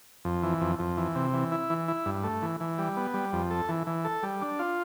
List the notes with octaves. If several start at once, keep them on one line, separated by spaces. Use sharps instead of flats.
F2
E3
F2
F2
E3
C3
E3
E4
E3
E4
G2
A3
E3
E3
G3
B3
G3
F2
A4
E3
E3
A4
G3
D4
F4